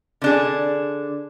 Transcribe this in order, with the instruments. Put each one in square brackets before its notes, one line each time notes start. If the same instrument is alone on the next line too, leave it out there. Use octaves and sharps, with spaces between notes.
[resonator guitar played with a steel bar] D3 D4 G#4